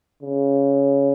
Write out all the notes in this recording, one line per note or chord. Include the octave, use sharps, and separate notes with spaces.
C#3